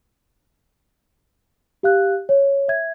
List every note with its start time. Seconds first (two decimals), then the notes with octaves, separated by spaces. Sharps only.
1.83 G4 F5 F#6
2.29 C#5
2.68 E5 G#6